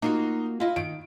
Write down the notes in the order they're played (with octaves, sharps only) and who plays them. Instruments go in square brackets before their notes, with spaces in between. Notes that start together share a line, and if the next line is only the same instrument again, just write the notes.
[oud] A#3 F4 F#4 [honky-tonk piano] D#4
[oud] E4 D#5 [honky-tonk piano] F4
[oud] D#3 [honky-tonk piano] D7